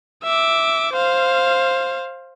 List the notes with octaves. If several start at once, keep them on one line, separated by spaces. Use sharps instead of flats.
E5 D6
C5 F5